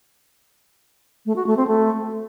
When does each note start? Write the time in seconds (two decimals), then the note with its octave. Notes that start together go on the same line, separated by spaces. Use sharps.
1.26 A3
1.36 F#4
1.47 A3
1.57 C4
1.67 A3